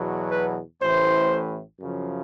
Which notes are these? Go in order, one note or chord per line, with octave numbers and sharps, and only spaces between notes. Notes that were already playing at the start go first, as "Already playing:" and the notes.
Already playing: E2 B2 F#3
B4
A1 A2 E3 C5
F#2 C#3 F3